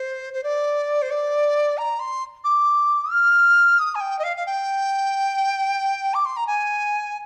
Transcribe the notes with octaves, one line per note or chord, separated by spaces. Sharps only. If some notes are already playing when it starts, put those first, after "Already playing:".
Already playing: C5
C5
D5
C5
D5
A#5
C6
D6
F6
D#6
G#5
G5
D#5
F5
F5
G5
D6
C6
A#5
G#5